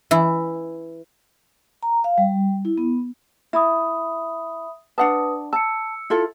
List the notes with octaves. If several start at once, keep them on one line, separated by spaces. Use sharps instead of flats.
E3 E4
A#5
F5
G3
E4
B3
E4 E5 B5 D#6
D4 B4 F#5 A5 D#6
A5 E6 C#7
E4 F4 A4